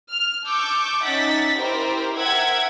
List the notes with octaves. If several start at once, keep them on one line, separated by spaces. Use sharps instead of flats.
F6
A5 C#6 D6 E6 G6
C#4 D#4 E5 F#5 A6 B6
E4 G4 A#4 C5 G5
A#4 E5 F#5 G5 E6 G#6